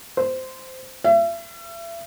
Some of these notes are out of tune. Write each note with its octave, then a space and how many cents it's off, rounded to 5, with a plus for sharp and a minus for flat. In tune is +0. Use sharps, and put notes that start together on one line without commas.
C5 -10
E5 +40